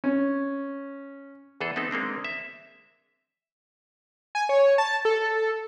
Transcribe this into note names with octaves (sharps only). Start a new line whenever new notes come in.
C#4
E2 E3 G#4 A4
B3 C4 D#4 A4
G#3 A#3 C4 D4
E5
G#5
C#5
A5
A4